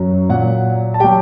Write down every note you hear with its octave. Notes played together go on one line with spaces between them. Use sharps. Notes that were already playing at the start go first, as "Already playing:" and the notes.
Already playing: F#2 F#3
A#2 F#3 F#5
A5
F#3 G4 G5